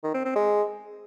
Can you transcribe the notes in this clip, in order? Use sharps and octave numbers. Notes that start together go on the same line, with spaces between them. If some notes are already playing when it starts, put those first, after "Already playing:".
D#3
C4
C4
G#3